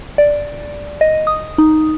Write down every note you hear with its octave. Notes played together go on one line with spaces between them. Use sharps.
D5
D#5
D#6
D#4